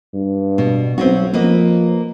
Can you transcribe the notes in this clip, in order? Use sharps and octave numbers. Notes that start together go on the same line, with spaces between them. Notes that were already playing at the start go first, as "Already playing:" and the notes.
G2
B2
B1 C4 C#4 F#4
F3 A#3 B4 D#5